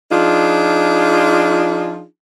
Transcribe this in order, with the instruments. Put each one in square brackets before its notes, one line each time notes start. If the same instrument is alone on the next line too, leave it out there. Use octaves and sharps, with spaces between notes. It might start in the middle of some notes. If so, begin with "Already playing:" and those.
[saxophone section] F3 D4 D#4 F4 G#4